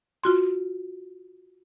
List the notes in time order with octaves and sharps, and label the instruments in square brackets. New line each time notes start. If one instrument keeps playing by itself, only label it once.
[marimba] F4 F#4 C6